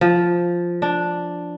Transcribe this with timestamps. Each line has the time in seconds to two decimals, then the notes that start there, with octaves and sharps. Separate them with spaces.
0.01 F3
0.82 D4